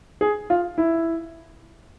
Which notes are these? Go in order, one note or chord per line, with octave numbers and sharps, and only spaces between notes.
G#4
F4
E4